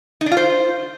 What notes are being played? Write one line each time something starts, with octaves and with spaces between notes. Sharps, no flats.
D#4
D4
F4
C5